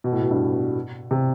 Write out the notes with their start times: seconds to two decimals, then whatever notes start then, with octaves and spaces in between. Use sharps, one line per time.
0.04 B2
0.12 A2
0.22 B2
0.31 G2
1.11 C3